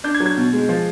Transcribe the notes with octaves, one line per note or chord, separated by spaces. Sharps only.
D4 G6
G#6
F#3
G#6
B2
G#3
F3